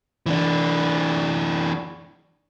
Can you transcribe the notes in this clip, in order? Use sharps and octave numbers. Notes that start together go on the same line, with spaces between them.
E3 D4